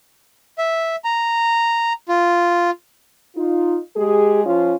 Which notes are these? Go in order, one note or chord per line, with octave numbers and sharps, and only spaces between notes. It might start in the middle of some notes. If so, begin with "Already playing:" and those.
E5
A#5
F4
D#4 F4
G#3 G4 G#4
F3 C#4 F4